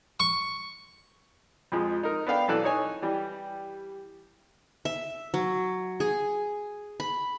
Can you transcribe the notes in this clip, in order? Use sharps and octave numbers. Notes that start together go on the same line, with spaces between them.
C#6
F2 F3 G#3
D#4 A#4
B3 D4 F5 G5
B1 E3 A4 D5 F#6
D#4 C#5 G#5
E3 G3 G4
E5
F#3
G#4
B5